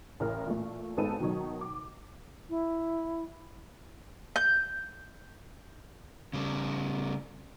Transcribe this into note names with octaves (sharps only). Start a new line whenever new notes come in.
A1 E3 A#4
A#2 E3 A3
G#1 G#3 B3 D#4 A4 D#7
B2 D#3 F#3 D#4
D6
E4
G6
C#3 G3